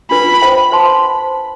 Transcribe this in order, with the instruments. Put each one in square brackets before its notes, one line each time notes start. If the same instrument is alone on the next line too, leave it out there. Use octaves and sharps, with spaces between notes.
[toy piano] D4 F4 B4 [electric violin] B5
[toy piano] C5 E5 G5
C5 E5 A5 C6